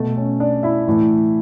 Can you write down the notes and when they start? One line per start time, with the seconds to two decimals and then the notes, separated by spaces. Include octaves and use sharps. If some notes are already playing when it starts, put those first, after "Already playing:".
Already playing: B2 A3 A4
0.17 C#4 C#5
0.40 D4 D5
0.63 E4 E5
0.87 A2 E3